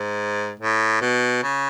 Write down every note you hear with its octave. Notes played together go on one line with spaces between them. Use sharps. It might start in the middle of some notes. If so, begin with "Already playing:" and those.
Already playing: G#2
A2
B2
C#3